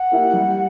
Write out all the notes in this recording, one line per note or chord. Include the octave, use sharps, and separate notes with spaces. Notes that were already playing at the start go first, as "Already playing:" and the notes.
Already playing: F#5
A#3 E4 G4 A#4
G3